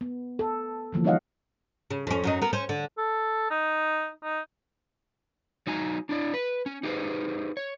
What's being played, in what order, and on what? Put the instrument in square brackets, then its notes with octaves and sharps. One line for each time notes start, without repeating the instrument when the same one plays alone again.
[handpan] B3
A4
D3 E3 F3 A#3
G3 D#4 C#5 D#5 F5 F#5
[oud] C#3
F2 C#4
F#2 F#3 D#4
B3 A#4
C#4 C5
D3
[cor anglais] A4
D#4
D#4
[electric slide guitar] F#3 D#4 G#5 A#5
D4 E4 D5
B4
C#4
D#4 G4 G#4 B4 C5
C#5